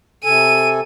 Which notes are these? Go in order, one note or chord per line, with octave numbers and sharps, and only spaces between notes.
C3 A4 G#5 D#7